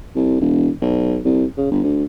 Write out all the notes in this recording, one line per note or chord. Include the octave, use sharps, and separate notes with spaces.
C2
E1
B1
C2
C#3
G1
D2